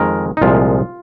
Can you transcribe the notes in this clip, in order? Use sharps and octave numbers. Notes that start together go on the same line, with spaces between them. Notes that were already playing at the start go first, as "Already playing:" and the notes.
Already playing: F2 D#3 G#3 A#4
D#4
C2 A#2 F3 G#3 F4